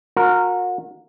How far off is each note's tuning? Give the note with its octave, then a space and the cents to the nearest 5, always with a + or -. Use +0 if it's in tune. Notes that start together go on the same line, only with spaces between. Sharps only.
F#4 -35 A#4 -10